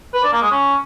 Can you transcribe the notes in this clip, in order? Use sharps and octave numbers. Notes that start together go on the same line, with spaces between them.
B4
D4
A#3
G#3
C#4